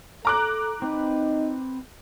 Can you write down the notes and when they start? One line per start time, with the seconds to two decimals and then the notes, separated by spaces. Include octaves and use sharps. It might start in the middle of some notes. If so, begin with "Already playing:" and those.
0.25 A4 A#5 D6 F#6
0.82 C4 D#4 B4